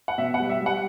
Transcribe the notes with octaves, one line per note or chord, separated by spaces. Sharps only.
F#5
B2 E5
F#5
G3
E5
G3
F#5